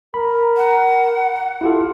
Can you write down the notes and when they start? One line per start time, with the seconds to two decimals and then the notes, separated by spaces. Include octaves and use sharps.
0.14 A#4 B5
0.57 F#5
1.61 E4 F4 G4 A4